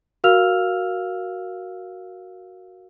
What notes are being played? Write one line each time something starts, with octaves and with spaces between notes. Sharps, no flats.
F#4 A#4 F5 E6 F6 F7